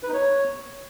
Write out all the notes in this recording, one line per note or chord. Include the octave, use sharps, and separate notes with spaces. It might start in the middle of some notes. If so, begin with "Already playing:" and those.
B4
D#4
C#5